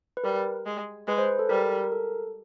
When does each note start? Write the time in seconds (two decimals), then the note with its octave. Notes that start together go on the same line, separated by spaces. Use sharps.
0.17 B4
0.24 G3 A#4
0.66 G#3
1.07 G#3 B4
1.18 C5
1.29 B4
1.39 A4
1.49 G3 A#4
1.84 A#4
1.92 A4